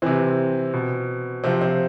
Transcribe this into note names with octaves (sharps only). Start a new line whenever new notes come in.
C3 E3 C4
B2
C3 F3 C4
C4